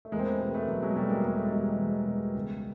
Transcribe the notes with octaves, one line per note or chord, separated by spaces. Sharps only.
A3
E2 G#3 A#3
C4
A3 B3
B2 G#3 A#3
A3 B3
E2 F#3
F#3 G#3
B2 G3 A3
G#3 A#3
E2 A#3
A3
G#3
B2 G3 A3
E2
B2
C#2